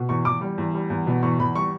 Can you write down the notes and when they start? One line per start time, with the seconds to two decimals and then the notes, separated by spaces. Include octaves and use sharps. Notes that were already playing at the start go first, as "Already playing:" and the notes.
Already playing: B2
0.09 E2 C#6
0.25 E2 D6
0.41 G3
0.58 E2
0.74 G3
0.90 E2
1.07 B2
1.23 E2 C#6
1.39 E2 B5
1.55 G3 C#6